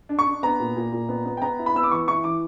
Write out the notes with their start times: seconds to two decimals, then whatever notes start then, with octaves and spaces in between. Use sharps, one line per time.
0.09 D4
0.19 C#6
0.27 D4
0.43 B3 A#5
0.60 A#2
0.76 A#2
0.92 A#2
1.09 B3
1.26 B3
1.37 G5
1.42 B3 A#5
1.59 E4
1.66 B5
1.75 B3 E6
1.83 D6
1.91 E3 C#6
2.08 E4 C#6
2.24 E3 D6